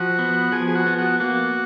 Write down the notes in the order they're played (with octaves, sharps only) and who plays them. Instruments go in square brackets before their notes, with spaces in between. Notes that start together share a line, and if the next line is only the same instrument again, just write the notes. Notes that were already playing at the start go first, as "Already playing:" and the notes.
Already playing: [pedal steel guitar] F3 [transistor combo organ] F#4
[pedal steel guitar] B3
[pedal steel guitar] F3 [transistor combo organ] G#4
[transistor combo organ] G#4
F#4
[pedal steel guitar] B3
[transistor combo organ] F#4
[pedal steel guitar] A#3 [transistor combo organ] F#4